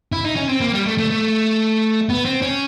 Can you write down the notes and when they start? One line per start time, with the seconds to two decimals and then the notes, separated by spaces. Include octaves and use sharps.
0.12 E4
0.24 D#4
0.36 C#4
0.49 C4
0.61 A#3
0.73 G3
0.86 A3
0.98 A3
1.10 A3
2.09 B3
2.25 C4
2.42 C#4